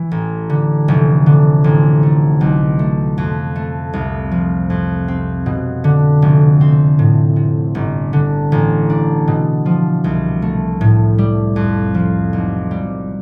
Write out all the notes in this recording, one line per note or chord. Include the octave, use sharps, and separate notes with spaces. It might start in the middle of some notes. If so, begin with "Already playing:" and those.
Already playing: E3
A1
D3
F1
D3
A1
A3
B1
A3
F2
A3
C2
F3
F2
C4
B2
D3
F1
C4
A2
C3
G1
D3
A1
D4
B2
F3
C2
A3
A2
G3
F2
F3
B1
G3